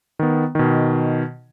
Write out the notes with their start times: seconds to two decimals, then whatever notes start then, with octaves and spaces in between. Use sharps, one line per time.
0.19 D#3 B3
0.55 B2 D#3